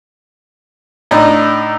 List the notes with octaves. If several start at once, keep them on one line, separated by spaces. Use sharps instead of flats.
A2 D4 D#4